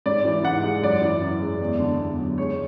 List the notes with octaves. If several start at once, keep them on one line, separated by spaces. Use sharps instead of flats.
G#2 D5
E3
G#2 F#5
G#3
F#2 D5
E3
F#2
G#3
E2
D3
E2
F#3
G#3 C#5